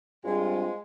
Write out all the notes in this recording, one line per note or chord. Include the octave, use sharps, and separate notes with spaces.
G2 G#3 C4 F4 G#5